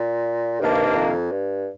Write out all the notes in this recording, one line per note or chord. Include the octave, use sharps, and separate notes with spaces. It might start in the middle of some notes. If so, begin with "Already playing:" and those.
Already playing: A#2
G2 C3 D#3 A#3 D4
F2
G2